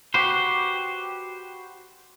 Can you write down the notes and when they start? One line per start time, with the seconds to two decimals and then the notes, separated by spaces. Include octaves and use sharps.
0.14 F#4 G4 B4 C5